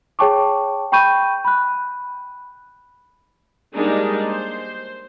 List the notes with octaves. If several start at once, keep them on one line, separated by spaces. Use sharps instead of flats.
G#4 C#5 G5 A5 C#6 D6
G5 B5 C#6 G6 D#7
B5 F#6
G3 G#3 A#3 D4 D#4
C5